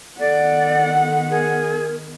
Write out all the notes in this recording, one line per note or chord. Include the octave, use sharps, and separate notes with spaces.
D#3 B3 A4 D5 F#5
G#4 A#4